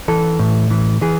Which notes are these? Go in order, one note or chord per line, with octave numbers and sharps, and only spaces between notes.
E3 A4
A2
E3
E3 G#4